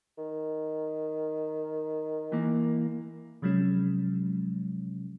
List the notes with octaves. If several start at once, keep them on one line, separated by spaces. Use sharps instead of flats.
D#3
E3 A#3
C3 F3 F#3 G#3 C#4